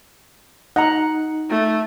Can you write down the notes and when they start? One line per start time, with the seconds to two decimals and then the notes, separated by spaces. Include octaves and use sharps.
0.76 D#4 D#5 F#5 A#5
1.50 A3